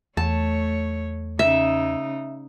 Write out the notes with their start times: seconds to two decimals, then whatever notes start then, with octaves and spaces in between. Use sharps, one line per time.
0.17 E2 A3 C#5 A5
1.39 C#3 D#4 E5